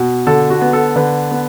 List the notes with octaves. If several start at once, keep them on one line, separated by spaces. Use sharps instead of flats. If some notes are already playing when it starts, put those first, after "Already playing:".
Already playing: B2
D3 A4
F#4
B3
A4
D3 B4
B3